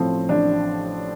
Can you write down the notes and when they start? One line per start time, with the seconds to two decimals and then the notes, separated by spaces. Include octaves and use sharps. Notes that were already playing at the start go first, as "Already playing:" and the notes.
Already playing: A1 A2 F3 C4
0.29 A1 D4